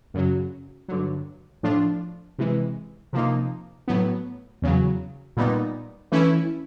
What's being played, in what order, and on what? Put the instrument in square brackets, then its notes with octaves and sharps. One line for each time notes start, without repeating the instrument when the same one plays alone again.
[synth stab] F#2 C#3 F#3
G2 D3 F#3
A2 F3 A3 D4 F4
C3 E3 G#3
C3 F3 A#3 D#4
A2 F#3 B3
E2 C#3 F#3
A#2 G3 B3 D#4
E3 A3 C#4 E4